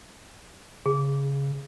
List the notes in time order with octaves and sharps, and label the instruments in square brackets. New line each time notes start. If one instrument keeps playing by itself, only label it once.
[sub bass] C#3 [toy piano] G#4